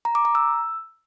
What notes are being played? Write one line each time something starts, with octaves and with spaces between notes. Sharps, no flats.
A#5
D6
A#5
E6